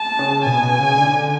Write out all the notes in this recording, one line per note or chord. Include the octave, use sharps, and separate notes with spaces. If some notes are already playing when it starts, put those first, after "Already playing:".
Already playing: A5
C#3
B2 G#5
B2
C#3
D3